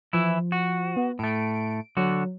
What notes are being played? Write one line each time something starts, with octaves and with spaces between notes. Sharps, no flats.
E3 F3 E4
F#4
B3
A2 A3 D7
D3 F#3 F#4